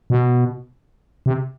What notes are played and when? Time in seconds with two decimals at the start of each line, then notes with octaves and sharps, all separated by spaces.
0.10 B2
1.26 C3